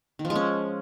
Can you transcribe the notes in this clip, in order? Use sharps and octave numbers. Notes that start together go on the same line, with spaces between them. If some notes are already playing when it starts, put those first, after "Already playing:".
D#3
F3
G#3
C#4